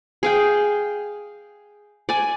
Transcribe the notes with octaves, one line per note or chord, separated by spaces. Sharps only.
G#4 F5 G5
D5 G#5